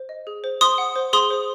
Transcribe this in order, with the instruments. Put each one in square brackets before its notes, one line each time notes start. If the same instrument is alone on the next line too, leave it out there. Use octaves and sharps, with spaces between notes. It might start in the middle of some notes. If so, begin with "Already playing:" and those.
Already playing: [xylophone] C5
D#5
G#4
C5
C5 C6 D#6
F#5
C5
G#4 C6 D#6
C5